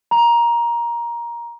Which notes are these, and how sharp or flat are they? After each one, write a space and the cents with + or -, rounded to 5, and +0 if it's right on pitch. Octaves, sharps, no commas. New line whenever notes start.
A#5 +15